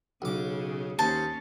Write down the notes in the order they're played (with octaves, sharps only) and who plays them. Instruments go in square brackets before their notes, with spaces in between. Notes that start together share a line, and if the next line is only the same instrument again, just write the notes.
[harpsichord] B1 D6 [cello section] C#3
[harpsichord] D#2 C5 [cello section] A#3 C#4 [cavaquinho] A5